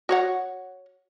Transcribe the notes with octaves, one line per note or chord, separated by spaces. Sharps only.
F#4 C#5 F#5